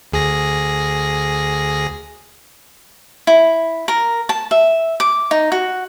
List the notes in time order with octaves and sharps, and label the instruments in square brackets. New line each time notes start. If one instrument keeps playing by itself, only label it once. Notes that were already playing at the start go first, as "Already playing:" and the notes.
[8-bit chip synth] D2 G#4 A#6
[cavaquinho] E4
A#4
A5
E5
D6
D#4
F#4